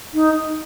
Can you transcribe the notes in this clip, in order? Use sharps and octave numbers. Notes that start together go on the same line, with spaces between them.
D#4